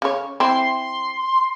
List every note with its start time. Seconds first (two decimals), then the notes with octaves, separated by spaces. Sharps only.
0.02 C#3 C#5
0.40 C4 E4 C6